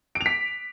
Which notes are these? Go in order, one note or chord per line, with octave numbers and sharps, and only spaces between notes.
D7
F7
B6